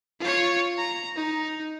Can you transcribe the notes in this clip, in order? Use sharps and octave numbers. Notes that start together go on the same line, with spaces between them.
F4 C#5
A#5
D#4